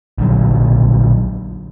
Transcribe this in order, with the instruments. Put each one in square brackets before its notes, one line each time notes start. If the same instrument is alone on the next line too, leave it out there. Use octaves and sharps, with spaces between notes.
[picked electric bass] A#1 D3 F#3